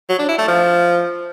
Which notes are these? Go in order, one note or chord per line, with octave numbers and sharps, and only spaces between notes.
F#3
D4
E4
A3
F3